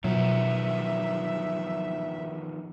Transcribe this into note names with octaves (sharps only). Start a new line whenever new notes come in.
B2 D#3 F3 F#3 B3 E5